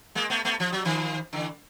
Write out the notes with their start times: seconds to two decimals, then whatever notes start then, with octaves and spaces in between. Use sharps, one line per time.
0.15 G#3 A#3
0.30 A3 B3
0.45 A3 B3
0.60 F3
0.72 F#3
0.85 D#3 F3
1.33 D3 E3